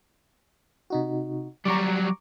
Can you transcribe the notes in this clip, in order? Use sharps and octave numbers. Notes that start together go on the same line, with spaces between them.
C3 D#4 F#4
F#3 G3 A#5 C#6 D6